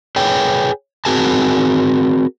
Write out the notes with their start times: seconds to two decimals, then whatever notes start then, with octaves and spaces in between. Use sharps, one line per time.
0.16 G#4 B4 C#5 G5
1.05 C4 F#4 G#4 A#4 G#5 A5